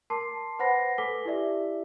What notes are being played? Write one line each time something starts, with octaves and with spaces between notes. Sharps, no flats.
A#4 A5 C6 D6 C7
B4 C5 F#5 B5 A#6 C7
A4 B4 G#5 D6 B6 G7
E4 G4 D5 E5